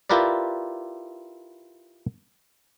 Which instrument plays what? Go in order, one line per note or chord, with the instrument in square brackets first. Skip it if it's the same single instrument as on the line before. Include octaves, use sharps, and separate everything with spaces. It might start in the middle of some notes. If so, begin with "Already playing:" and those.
[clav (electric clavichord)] E4 F4 G4 A#4 B4 D5